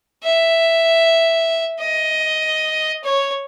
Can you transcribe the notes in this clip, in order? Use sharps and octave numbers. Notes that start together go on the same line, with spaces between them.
E5
D#5
C#5